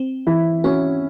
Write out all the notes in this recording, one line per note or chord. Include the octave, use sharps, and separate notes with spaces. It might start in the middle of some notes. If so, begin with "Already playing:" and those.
Already playing: C4
E3 E4
C#4 F#4